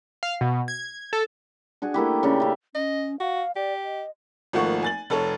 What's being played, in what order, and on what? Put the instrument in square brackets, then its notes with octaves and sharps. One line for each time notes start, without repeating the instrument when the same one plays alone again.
[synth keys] F5
B2
G#6
A4
[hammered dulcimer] D4 F#4 G#4
A3 A#3 E4 G4
C#3 D4 G5
E5 F5
[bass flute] C#4 [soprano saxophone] D#5
[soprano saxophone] F#4 [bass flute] F5
[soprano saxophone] G4 [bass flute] D5
[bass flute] D#5
[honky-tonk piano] G#1 F3 A3 A#3 F#5 C#6
G#5 A6 F#7
F1 A4 C#5